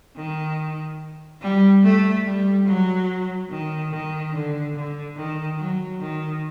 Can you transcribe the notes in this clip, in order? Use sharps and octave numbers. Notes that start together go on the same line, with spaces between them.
D#3
G3
A3
G3
F#3
D#3
D#3
D3
D3
D#3
F#3
D#3